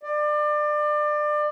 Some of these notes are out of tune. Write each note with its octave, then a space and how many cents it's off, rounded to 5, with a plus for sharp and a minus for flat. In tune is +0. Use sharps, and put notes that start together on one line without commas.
D5 +30